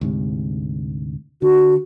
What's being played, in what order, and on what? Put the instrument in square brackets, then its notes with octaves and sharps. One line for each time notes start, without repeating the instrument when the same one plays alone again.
[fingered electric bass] D2 G#2 C3
[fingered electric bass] D3 [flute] F#4